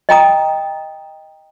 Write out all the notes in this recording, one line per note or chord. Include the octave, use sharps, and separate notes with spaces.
D#5 G5 A#5 D#6